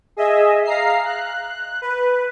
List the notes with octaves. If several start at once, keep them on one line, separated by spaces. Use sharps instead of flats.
G#4 D#5 E5
F5 A#5 C7
F#6
B4